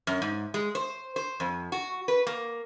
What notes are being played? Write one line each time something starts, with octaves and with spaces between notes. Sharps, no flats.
F#2
G#2
G#3
C5
C5
F2
F#4
B4
A#3